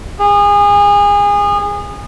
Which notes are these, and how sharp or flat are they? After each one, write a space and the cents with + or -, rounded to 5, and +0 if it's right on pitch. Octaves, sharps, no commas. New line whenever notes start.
G#4 -30